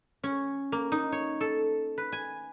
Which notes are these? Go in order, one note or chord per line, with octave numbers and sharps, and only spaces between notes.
C#4
A#3
D#4
C#5
A4
B4
G#5